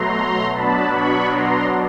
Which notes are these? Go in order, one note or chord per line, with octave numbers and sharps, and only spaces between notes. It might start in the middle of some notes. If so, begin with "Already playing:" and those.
Already playing: B2 F#3 A3 A#5 C6
B2 F#3 B3 D4 A5 B5
B5 C#6
A#5 C6